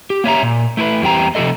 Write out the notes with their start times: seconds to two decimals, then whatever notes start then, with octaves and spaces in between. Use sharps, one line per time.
0.10 G4
0.24 A#3 C#5 E5 A#5
0.42 A#2
0.77 A3 E4 A#4 B4
1.02 E2 G3 C4 G4 G5 A#5
1.35 C3 F3 A3 A4 D#5